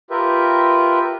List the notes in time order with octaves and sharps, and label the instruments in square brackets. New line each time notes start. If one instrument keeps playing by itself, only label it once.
[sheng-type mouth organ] F4 G4 A#4 B4 E5